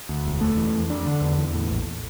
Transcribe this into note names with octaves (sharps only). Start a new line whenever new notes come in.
D2
E1
A3
E3
F2
D4
D3
E2
E2
A2
A#1